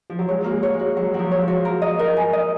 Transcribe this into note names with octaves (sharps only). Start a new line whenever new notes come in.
F3
F#3
G#3 C#5
A#3 F#4
G#3
C#5
G#3
F#4
F#3 C#5
F#3 F#4
F3
C#5
F3
F#4
A#4
D#5
A#4
G#5
D#5